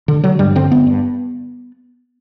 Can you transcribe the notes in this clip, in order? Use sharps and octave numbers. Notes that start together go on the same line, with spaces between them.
D3
D3 F#3
G2 G3
D3 C4
G2 B3
G2